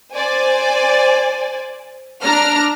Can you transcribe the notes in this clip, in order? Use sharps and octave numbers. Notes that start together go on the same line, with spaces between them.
C5 D5 G#5
D4 A#5 F6